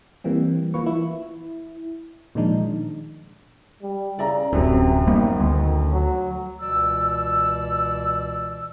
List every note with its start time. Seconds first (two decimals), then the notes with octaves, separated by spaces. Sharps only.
0.24 E3 G3 A#3 C4
0.74 E3 A#3 F4 B4 C#6
0.86 E4
2.35 A#2 D#3 F3 G#3 D4 D#4
3.82 G3
4.19 C#3 D5 E5 A#5
4.53 D1 F#2 C3 F#3
5.07 D#3 G3 A#3 B3
5.40 D2
5.93 F#3
6.60 C#2 B2 E3 D5 E6